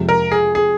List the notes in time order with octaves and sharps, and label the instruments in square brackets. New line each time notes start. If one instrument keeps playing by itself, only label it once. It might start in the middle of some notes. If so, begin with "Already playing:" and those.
Already playing: [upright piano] F2 C3 F3 G#3
[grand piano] A#4
G#4
G#4